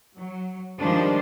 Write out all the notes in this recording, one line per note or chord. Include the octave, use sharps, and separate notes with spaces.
F#3
D#3 F3 G3 G#3 D4 C5